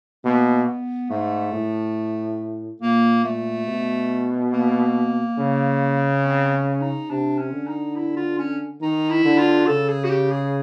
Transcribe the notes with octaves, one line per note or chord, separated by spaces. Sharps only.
B2 A#3
B3
G#2 A3
A2
A#2 A#3
A#2 A3
B2
A#3
C#3
C4
C#4
D#4
C3 D4
C#4
D3
D#4
E4
F4
C#4
D#3 D#4
E4
D3
F4
C#3 A4
G#4
F#4
G4
G#4